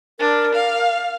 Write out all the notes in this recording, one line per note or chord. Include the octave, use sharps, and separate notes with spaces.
D4 A#4
F5